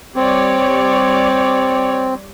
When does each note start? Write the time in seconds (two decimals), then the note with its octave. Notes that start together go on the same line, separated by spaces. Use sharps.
0.16 G3 C4 C#5 D5